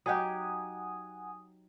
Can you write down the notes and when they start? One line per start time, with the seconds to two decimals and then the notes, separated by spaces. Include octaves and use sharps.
0.06 F#3 D#4 G4 F#5 G#5 D#6